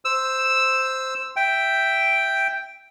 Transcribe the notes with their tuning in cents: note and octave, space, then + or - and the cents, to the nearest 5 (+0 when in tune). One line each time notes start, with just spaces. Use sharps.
C5 +0 E6 +0
E5 +0 G5 +0